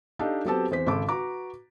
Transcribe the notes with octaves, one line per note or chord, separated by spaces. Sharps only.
D4 D#4 G4 A4 D#5 F5
F#3 B3 C4 G4 A4 A5
E2 C4 C5 B6
G#1 C#3 A4 D6
F#4 B4 A#5 D6